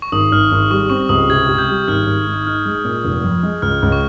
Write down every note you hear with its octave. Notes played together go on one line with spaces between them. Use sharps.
C#6
G#1 D#6
G#1 F6
G#1
G3 C#6
C4 C#6
C#2 D#6
C3 G#6
C3
G6
G3
G#1 F6
G#1
G#2
D#4 F6
G#3
A#2
F1
F2
G#3
C#2 F6
C#2
C#6